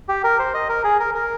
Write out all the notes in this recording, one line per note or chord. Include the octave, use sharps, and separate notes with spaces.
G4
A#4
C5
D#5
A#4
G#4
A#4
A#4